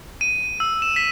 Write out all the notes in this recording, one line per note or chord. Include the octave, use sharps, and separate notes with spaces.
D#7
E6
E7
B6